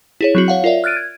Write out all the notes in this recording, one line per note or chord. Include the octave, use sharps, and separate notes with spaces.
E4 G#4 C#5
F#3 C4 F#4
C#5 F5 F#5
F4 A#4 D5 E5
F6 F#6 A6 D7 D#7
G#6